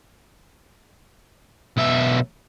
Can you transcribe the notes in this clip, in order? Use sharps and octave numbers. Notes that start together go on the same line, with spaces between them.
B1 E5